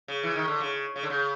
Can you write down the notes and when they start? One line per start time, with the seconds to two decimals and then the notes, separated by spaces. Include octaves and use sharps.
0.08 C#3
0.23 E3
0.36 D#3
0.48 D3
0.60 C#3
0.96 C#3
1.03 D3
1.10 C#3